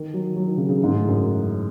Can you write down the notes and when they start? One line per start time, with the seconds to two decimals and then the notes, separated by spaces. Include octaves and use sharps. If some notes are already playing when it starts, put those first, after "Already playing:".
Already playing: D#3
0.14 F#3
0.36 F#3
0.47 D#3
0.57 C#3
0.69 C#3
0.83 G#2
0.94 A2
1.08 F#2